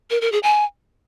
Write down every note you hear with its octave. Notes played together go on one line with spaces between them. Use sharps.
A#4
A#4
G#4
G#5